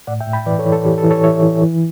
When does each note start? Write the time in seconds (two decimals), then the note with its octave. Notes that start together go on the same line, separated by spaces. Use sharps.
0.07 A2 D5 F#5
0.20 E5 G5
0.27 A2
0.33 G5 B5
0.46 E3 B4 D5
0.59 A4 C#5
0.66 E3
0.72 A4
0.85 E3 G4
0.98 A4
1.04 E3
1.10 A4 C#5
1.24 E3 C#5 E5
1.43 E3
1.62 E3